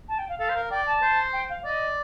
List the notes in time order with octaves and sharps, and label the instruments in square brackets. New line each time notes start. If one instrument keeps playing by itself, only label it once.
[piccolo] A5
G5
F5
[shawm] A4 [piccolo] F5
[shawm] C5
A#4
[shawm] D5 [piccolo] G5
[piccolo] A5
[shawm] C5
[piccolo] G5
F5
[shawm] D5 [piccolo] D#5